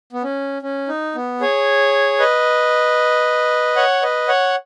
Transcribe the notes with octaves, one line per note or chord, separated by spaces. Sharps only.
B3
C#4
C#4
D#4
B3
G#4 C#5
B4 D#5
C#5 F#5
B4 D#5
C#5 F#5